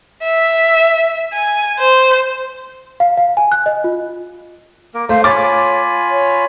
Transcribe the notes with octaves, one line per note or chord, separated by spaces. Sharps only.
E5
G#5
C5
F5
F5
G#5
F#6
D#5
F4
A#3 A#4
A3 C5 F5
F4 C#5 G#5 B5 D6 A6
C#5